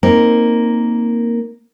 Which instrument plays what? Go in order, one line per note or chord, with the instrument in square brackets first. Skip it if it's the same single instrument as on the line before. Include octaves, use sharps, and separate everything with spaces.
[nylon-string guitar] A#3 C4 D#4